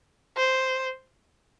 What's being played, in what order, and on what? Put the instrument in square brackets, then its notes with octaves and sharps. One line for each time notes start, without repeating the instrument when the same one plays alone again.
[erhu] C5